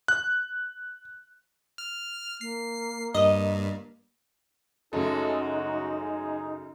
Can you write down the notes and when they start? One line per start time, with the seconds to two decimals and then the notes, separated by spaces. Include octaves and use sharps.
0.08 F#6
1.78 F6
2.41 A#3 C7
3.14 G2 D#5
4.93 F#2 C#3 F#3 G#3 A3 D#4 A4
5.41 F#4
5.98 G#4